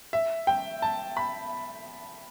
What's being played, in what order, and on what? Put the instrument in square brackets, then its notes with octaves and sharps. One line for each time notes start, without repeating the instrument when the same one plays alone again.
[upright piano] E5
G5
A5
B5